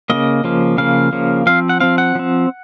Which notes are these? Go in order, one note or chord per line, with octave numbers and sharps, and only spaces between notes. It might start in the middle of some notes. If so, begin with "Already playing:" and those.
C#3 F3 A#3 D#5
C#3 F3 A#3
C#3 F3 A#3 F5
C#3 F3 A#3
F3 C4 F5
F#5
F3 C4 F5
F#5
F3 C4